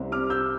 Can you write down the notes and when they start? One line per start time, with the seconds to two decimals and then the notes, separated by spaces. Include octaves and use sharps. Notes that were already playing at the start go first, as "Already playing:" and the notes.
Already playing: C2 C3 G3 C4
0.12 D6 F6
0.30 E6 G6